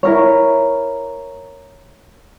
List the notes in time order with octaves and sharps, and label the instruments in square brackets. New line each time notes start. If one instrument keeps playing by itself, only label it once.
[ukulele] E4 A#4 C#5